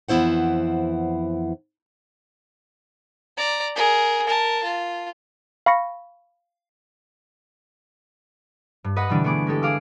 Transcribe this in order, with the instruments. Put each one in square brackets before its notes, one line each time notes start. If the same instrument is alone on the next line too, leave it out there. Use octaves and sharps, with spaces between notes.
[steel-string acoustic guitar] F2 E3 B3 E4 C5 F#5
[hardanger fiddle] D5 A#5
G#4 A#4
A#4 A5
F4
[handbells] F5 B5 C#6 A#6 C#7
[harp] G2
B4 D#5 F#5 B6
B2 D3 E3 G3 D4
A3 B3 G#4 D6
G#3 E4 G4 A4
G#4 F5 D6 E6